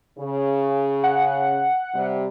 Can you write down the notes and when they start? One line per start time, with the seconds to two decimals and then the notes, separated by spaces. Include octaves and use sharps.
0.19 C#3
1.04 F#5
1.95 C3 G3